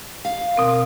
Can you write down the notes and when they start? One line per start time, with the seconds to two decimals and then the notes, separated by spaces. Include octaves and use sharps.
0.25 F5
0.57 B2 C4 A#4